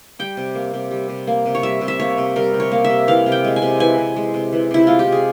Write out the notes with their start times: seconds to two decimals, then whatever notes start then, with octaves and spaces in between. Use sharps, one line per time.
0.19 G3 G5
0.37 C3
0.55 A#3
0.74 C3
0.91 G3
1.09 C3
1.27 A#3
1.46 C3
1.55 C#5
1.63 G3 E5
1.81 C3
1.88 E5
1.99 A#3 C#5
2.18 C3
2.36 G3 A#4
2.54 C3
2.60 C#5
2.72 A#3
2.84 E5
2.89 C3
3.07 E3 F5
3.26 C3
3.32 G5
3.44 G#3
3.56 G#5
3.62 C3
3.80 E3 G#5
3.98 C3
4.16 G#3
4.34 C3
4.52 E3
4.71 C3 E4
4.87 G#3 F4
4.99 G4
5.07 C3
5.12 G#4